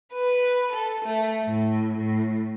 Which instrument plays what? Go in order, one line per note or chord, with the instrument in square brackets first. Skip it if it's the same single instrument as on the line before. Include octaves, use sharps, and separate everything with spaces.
[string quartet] B4
A4
A3
A2
A2